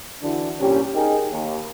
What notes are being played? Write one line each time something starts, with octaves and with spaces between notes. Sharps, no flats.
D3 E3 D4 E4 F#4
C2 A#2 C#4 G4
D#4 G#4 A#4 G5 G#5
D#2